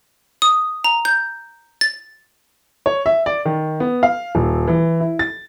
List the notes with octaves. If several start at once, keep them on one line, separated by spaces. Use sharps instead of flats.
D#6
A#5
G6
A6
C#5
E5
D5
D#3
B3
F5
D#1
E3
E4
A6